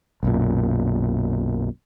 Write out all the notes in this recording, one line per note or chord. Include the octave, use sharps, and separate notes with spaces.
B1 F#2 A#2